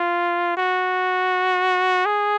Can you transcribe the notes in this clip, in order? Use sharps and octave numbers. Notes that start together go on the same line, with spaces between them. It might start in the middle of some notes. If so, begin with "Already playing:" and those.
Already playing: F4
F#4
G#4